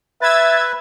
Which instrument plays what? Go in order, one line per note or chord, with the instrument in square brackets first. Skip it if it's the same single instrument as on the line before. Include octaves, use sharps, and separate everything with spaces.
[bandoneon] B4 [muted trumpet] E5 [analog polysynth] E6 G#6 A6